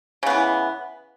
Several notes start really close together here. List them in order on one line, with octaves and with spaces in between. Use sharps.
C#3 B3 E3